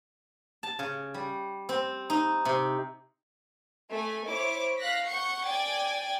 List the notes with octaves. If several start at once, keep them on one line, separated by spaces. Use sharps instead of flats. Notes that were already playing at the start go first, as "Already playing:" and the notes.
A5
C#3
G3
C4
D#4
C3
A3 G#5
E4 C5 C#5 D6
F5 F#6 A#6 B6
F#5 C#6 G6 C#7
D5 G5 G#5 G#6 A6